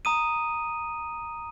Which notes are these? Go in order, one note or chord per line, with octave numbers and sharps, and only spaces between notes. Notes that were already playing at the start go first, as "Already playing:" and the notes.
A#5 D#6 D#7